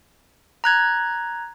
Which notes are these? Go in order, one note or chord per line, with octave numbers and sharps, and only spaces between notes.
A#5 F#6 G#6